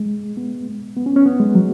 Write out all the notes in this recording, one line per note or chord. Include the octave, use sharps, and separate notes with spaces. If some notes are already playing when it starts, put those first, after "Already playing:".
Already playing: G#3
B3
B3
C#4
C#4
B3
G#3
F#3